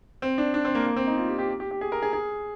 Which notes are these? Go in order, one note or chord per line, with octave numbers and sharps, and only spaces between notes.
C4
D4
D4
C4
A#3
A#3
C4
D#4
F4
G4
G4
G4
G4
G#4
A#4
G#4
G#4